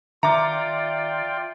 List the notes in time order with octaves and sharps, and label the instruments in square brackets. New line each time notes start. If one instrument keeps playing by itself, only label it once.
[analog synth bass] D#3 [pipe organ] F4 D5 G5 [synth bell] E5 C6 [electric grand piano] A#5 D6